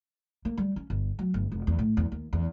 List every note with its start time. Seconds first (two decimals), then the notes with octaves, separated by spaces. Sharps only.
0.45 A#3
0.57 G3
0.76 C#4
0.90 G1
1.19 F#3
1.34 G1
1.52 F1
1.67 E2
1.79 A2
1.97 E2
2.12 D#2
2.33 E2